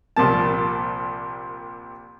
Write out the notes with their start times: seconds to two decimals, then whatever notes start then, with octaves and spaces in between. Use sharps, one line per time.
0.16 C2 A#2 F3 A#3 A5